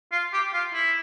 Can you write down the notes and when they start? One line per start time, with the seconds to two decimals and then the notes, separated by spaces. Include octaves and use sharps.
0.12 F4
0.33 G4
0.54 F4
0.73 E4